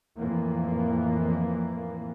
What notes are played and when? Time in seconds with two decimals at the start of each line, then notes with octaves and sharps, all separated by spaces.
0.18 F2 A2 E3 A#3